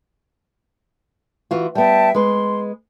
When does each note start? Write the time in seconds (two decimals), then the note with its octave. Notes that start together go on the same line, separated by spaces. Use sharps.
1.51 E3 F4 F#4
1.75 G3 B3 E5 G5 A5
2.15 G#3 B4 C6